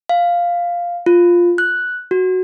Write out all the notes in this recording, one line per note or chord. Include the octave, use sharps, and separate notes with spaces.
F5
F4
F#6
F#4